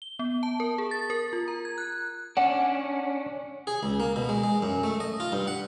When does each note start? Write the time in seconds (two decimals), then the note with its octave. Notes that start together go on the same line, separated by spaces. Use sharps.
0.02 G7
0.19 B3
0.43 A5
0.60 A#4
0.78 G#4
0.91 A6
1.10 A#4
1.33 F4
1.48 A#5
1.65 G#6
1.78 F#6
2.37 C#4 D4 F#5
3.67 G#4
3.83 C#2
4.00 A#3
4.16 B2
4.29 G#3
4.44 G#3
4.62 F#2
4.83 A3
5.00 D#5
5.20 F4
5.32 G2
5.47 F#5